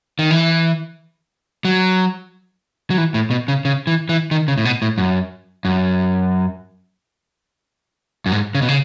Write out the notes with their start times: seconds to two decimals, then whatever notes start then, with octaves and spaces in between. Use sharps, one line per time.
0.19 D#3
0.31 E3
1.65 F#3
2.90 F#3
2.98 E3
3.14 A2
3.31 B2
3.48 C#3
3.65 C#3
3.87 E3
4.09 E3
4.31 D#3
4.48 C#3
4.58 A2
4.65 B2
4.82 A2
4.98 F#2
5.65 F#2
8.26 F#2
8.32 G#2
8.55 C#3
8.62 B2
8.69 C#3